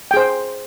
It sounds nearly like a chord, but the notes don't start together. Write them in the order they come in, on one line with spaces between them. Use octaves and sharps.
G5 G#4 C5